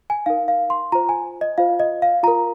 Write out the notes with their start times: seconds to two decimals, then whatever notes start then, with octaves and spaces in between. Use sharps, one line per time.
0.10 G#5
0.26 D#4 A#4 F5
0.48 F5
0.70 C6
0.92 F4 C5 A#5
1.09 G#5
1.41 D#5
1.58 F4 C5 F5
1.80 D#5
2.02 F5
2.23 F4 A#4 A#5